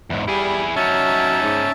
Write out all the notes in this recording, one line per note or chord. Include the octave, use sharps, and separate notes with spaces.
E2 G#2
G3 E4 G#4
F#3 C#4 D#4 E5 A5
G#2